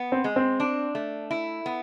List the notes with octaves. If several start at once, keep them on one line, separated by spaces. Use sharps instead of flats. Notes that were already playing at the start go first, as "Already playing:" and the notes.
Already playing: B3
C4
G#3
C4
D4
A3
E4
B3